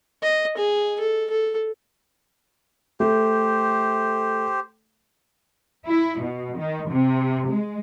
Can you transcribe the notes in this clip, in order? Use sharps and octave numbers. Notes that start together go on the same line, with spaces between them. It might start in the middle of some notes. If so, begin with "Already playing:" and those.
D#5
G#4
A4
A4
A3 G4 C5
E4
B2
D#3
C3
G#3